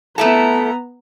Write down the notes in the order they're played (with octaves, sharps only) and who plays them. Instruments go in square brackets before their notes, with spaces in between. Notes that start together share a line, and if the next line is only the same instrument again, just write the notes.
[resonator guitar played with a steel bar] A3 E4 A4 [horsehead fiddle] B3 A#5